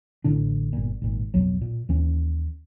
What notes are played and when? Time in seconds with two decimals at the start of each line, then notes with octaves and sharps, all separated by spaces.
0.24 A1 A2 D3 D4
0.73 G1 A#2
1.02 G#1 A#2
1.34 B1 F2 F#3
1.61 A#2
1.89 D#2 E3 C#4